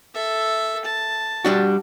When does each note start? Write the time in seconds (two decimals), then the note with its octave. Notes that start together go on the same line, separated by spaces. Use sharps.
0.14 A4 E5
0.85 A5
1.45 G3 D4 F#4